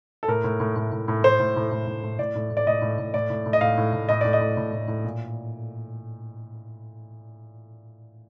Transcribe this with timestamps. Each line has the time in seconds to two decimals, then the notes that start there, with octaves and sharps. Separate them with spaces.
0.23 A4
0.28 A2 A#4
0.44 A2
0.60 A2
0.76 A2
0.92 A2
1.08 A2
1.24 A2 C5
1.39 A2
1.56 A2
1.71 A2
1.87 A2
2.03 A2
2.19 A2 D5
2.35 A2
2.51 A2
2.57 D5
2.66 A2 D#5
2.82 A2
2.98 A2
3.14 A2 D5
3.30 A2
3.46 A2
3.53 D#5
3.61 A2 F5
3.78 A2
3.93 A2
4.09 A2 D#5
4.21 A2 D5
4.33 D#5
4.41 A2
4.57 A2
4.73 A2
4.88 A2
5.04 A#2